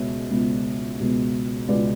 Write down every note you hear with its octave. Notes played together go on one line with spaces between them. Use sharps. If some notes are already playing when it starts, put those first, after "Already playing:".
Already playing: C#2 B2 G#3 B3 C#5 E5
C#2 B2 G#3 B3
C#2 B2 G#3 B3
C#2 B2 G#3 B3 B4 D5